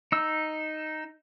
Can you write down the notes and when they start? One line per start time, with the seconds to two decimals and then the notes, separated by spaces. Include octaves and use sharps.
0.12 D#4 E6